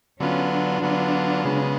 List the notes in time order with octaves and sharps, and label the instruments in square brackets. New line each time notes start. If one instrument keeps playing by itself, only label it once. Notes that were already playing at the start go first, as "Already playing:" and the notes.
[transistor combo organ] D3 F#3 B3 F4 [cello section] C#4
[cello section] D4
[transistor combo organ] D3 F#3 B3 F4
C#3 G#3 B3